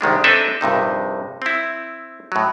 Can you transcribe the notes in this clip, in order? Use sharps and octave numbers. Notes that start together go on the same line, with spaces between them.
C2 D#3 G#3 D4
C4 D4 A4 B4 D#5 E5
A#1 G2 C3 D#4
C4 E4
A2 F#3